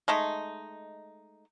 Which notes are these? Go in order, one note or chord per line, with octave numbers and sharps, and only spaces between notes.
G#3 A3 D#4